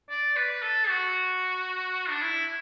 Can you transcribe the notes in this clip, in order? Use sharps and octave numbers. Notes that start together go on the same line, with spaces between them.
D5
B4
A4
F#4
D4
E4